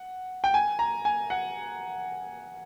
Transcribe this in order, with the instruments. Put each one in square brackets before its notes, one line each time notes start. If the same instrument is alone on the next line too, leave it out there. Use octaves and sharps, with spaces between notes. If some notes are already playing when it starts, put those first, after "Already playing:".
Already playing: [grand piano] F#5
G5
G#5
A#5
G#5
F#5